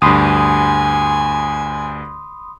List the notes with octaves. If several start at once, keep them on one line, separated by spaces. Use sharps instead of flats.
D2 G2 G#5 B5 C6 D#6